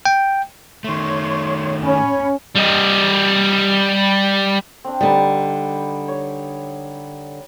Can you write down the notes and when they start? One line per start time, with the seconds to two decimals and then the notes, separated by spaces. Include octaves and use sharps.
0.05 G5
0.84 D#3 A3 C#5 C6 C#6
1.84 C#4 C#5 B5
2.55 G3 D#5
4.84 C4 D4
5.01 D3 G3 D#4 G4 B4
6.08 C#5